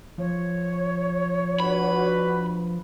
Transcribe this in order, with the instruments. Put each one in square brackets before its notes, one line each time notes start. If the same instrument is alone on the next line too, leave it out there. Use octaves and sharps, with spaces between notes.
[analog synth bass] F3 [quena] C#5
[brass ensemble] D4 F#4 B4 [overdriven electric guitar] B5